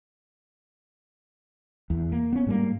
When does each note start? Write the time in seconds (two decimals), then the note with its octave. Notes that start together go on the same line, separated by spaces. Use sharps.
1.90 E2
2.12 A#3
2.33 B3 C#4
2.46 G#2 G3 A#3